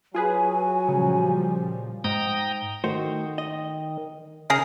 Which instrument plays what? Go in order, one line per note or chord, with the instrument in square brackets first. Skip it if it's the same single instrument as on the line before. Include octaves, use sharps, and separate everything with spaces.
[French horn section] F#3 [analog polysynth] F4 G#4 B4 [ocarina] G#5
[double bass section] A#2 F3 G3 [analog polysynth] C#3
[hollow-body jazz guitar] G#2 [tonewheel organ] G5 A#5 D#6
[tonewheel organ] D#3 [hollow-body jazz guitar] A3 F#4 C5
[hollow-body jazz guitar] D#5
[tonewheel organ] C#3 C#4 [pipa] G#4 A#4 A#5